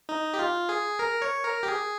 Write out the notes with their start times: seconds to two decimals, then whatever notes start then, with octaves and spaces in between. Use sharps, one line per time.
0.09 D#4
0.34 G4
0.39 F4
0.69 G#4
0.99 A#4
1.22 C#5
1.44 A#4
1.63 G4
1.68 G#4